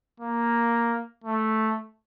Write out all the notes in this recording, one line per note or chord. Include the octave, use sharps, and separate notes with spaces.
A#3
A3